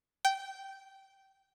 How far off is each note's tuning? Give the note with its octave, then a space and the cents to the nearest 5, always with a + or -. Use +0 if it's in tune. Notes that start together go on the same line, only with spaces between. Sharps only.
G5 -15